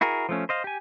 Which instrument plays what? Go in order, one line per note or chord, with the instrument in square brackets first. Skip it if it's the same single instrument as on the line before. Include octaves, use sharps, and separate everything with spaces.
[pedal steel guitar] E4 F#4 G#4 A#4
F3 A3 C#4
C5 D#5 F5
G4 G#5